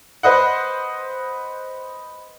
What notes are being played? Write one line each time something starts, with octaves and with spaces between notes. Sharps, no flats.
B4 C5 D#5 F#5